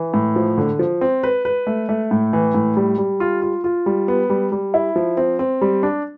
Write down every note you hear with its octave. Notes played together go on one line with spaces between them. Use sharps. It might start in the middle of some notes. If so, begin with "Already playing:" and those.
Already playing: E3
A2
F3
D3
F3
C4
B4
B4
A3
A3
A2
E3
A2
G3
G3
F4
F4
F4
G3
B3
G3
G3
E4
F3
C4
C4
G3
D4